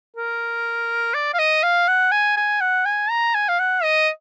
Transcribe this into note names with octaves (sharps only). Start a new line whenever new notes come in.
A#4
D5
F5
D#5
F5
F#5
G#5
G#5
F#5
G#5
A#5
G#5
F5
F#5
D#5